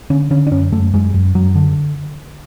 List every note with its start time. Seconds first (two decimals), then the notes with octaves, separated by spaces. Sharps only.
0.10 D3 C#4
0.31 D3 C#4
0.47 D4
0.51 F#2 C#4
0.72 F#2 A3
0.94 F#2 G#3
1.14 F#2
1.35 F#2 F#3
1.55 D3